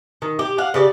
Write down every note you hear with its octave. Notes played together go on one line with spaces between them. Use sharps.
D#3
G4
F5 F#5
C#3 G4 D5